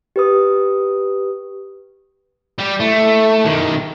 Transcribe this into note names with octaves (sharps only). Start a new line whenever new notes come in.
G4 B4 D#6
G3 G4
A3 E4
B1 D#3